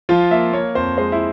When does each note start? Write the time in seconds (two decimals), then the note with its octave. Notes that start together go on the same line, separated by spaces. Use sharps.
0.09 F3 F4
0.31 A#3 E5
0.53 A#3 C#5
0.75 F2 C5
0.97 G#3 C5
1.12 E4